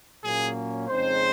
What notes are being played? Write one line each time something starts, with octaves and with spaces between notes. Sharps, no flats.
A#2 F#3 A#3 C#4 G#4
F2 C#3 G#3 C4 D#4 C5